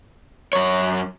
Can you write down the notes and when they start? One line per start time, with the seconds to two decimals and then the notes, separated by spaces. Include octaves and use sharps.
0.53 F#2 C#5